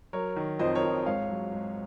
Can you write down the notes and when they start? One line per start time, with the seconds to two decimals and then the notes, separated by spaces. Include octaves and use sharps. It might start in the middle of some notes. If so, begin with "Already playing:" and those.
0.13 F#3 A#4 C#5
0.36 D#3
0.59 F2 C5 D#5
0.75 A#4 C#5
0.83 F2
1.06 G#2 C#5 F5
1.30 F#3
1.53 G#2